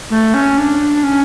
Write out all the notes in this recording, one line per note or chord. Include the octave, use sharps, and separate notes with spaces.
A3
C#4
D4
C#4